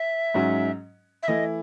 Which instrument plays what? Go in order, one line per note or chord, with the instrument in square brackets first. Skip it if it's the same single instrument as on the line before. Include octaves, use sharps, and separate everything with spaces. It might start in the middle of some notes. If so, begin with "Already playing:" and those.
Already playing: [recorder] E5
[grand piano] G#2 F#3 C#4 F#4
[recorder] E5
[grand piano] E3 A3 E4 [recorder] D#5